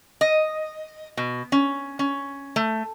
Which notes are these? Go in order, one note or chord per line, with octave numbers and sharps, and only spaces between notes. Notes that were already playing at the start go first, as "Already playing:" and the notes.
D#5
B2
C#4
C#4
A3